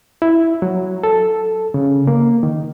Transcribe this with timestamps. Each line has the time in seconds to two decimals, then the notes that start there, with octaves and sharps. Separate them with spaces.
0.22 E4
0.62 F#3
1.03 A4
1.74 C#3
2.07 A#3
2.43 D#3